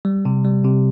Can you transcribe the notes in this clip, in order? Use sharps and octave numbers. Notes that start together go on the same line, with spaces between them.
G3
C3
G3
C3